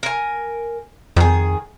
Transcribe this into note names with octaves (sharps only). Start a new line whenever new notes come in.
A#4 G#5
F2 D#3 G#4